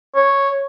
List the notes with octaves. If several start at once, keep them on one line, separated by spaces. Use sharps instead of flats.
C#5